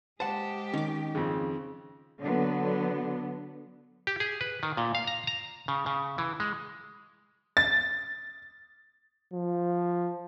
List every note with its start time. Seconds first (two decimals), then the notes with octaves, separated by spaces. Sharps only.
0.20 G#3 G4 C5 F#5 A5
0.74 D#3 C#4 D6
1.15 F2 C#3
2.20 D3 F#3 B3
4.07 G4
4.20 G#4
4.41 B4
4.63 D#3
4.77 A#2
4.95 F5
5.07 A#5
5.27 A#5
5.68 C#3
5.86 C#3
6.18 E3
6.40 G#3
7.57 A6
9.33 F3